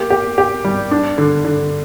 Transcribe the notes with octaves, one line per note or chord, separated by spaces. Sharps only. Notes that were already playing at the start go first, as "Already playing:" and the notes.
Already playing: A#3 G4
G4
G4
G3
D4
D3
D3